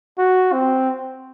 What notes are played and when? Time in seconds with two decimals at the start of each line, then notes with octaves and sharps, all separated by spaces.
0.18 F#4
0.53 C4